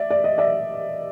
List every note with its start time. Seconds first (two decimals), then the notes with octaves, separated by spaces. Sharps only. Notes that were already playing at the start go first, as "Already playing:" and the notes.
Already playing: D5 E5
0.10 D5
0.24 D#5
0.38 D5 E5